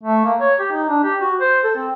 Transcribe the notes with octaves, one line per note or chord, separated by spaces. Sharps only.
A3
A#3
C#5
G4
D#4
D4
G4
F#4
C5
A4
C4